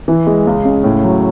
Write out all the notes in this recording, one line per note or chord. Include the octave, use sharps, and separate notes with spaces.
E3
G#3
C#2
C#3
A2
F#3